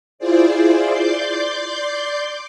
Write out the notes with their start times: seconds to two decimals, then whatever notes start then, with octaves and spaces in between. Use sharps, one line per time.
0.19 E4 F4 G#4 C5 D5
0.89 D5 C6 D6 G6